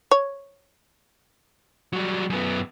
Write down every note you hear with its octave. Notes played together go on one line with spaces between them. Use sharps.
C#5
F#3 G3
F#2 B3